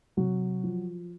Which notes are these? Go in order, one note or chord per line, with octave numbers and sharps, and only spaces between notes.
C3 F#3 F#4
F3